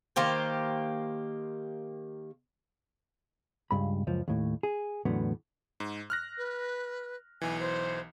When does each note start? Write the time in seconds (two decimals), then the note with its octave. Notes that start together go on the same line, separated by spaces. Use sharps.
0.16 D#3 A#3 G4 C5
3.71 C#2 G2 B5
4.07 C#2 F#2 F3
4.28 D#2 A2
4.63 G#4
5.05 E2 A2 D3 F#3 B3
5.80 G#2
6.10 F6 F#6 A#6
6.38 B4
7.41 B1 E3 G#5
7.60 C5